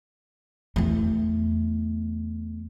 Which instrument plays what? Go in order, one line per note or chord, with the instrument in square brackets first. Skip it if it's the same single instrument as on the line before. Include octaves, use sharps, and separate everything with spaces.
[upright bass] E2 A3